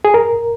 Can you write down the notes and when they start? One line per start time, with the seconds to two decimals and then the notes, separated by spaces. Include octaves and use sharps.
0.05 G#4
0.14 A#4